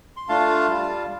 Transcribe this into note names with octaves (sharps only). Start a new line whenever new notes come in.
C6
A3 D4 F4 F5 A5
G3 F4